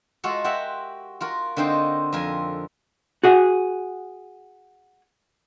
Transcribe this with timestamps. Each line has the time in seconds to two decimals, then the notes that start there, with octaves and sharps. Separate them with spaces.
0.24 G#3 F4 F#4 A4
0.44 F#4 G4 A#4 E5 F#5
1.21 F4 F#4 A#4
1.57 D3 A#3 C4 D#4 C5
2.13 F2 F4 A#4 G#5
3.23 F#4 G#4 F#5